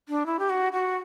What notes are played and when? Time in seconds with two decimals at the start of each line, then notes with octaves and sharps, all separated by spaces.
0.09 D4
0.26 E4
0.39 G4
0.50 F#4
0.73 F#4